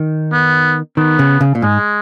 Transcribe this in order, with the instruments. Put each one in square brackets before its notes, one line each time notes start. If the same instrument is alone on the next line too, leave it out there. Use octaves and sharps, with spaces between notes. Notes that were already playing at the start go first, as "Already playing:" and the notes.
Already playing: [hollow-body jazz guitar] D#3
[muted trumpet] B3
[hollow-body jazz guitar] D#3 [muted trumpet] B3
[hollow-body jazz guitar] C#3
C#3
A#2
[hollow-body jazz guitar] G#2 [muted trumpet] G#3